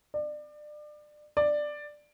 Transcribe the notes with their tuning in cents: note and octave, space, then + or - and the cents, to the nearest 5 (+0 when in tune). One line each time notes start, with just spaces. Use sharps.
D5 +30
D5 +10